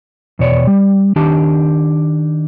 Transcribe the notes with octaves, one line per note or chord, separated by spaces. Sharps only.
E2 B2 C#5 D5
G3
D#3 D4 G4 A5